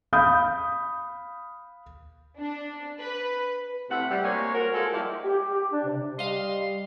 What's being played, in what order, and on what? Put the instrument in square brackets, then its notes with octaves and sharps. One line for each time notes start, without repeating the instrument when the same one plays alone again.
[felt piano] F5 B5 D#6 G6
[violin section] D4
B4
[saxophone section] A2 C3 E5 F#5
G3
G#3 A#3 C4 C#5
F#4 A#4
G#3 F4 A4
F3 G3 G#3 A#3 E4 F#4
[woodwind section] G4
G4
G4
D4
C3
[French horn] G3 [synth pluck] D#5 F5 [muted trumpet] C6